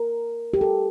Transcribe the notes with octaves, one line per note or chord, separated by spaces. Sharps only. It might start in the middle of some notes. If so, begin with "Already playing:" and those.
Already playing: A#4
G4
A4